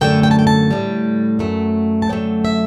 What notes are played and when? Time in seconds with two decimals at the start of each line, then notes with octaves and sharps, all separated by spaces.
0.01 F#2 D3 A3 G5
0.23 G5
0.31 A5
0.39 G5
0.47 A5
0.71 A2 G3
1.39 F#2 F#3 A3
2.02 A5
2.09 F#2 D3 F#3 A3 G5
2.45 E5